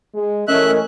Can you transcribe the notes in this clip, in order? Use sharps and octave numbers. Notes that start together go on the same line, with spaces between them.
G#3
E3 A3 C#4 A#4 D#5 E5 F#6